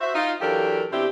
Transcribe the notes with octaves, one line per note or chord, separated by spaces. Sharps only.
F#4 C5 E5
D#4 F4
E3 F#3 D4 G4 A4 A#4
B2 C4 D4 E4 G4